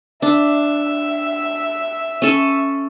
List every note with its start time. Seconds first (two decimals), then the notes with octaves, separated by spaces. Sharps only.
0.22 D4 E5
2.22 C#4 A4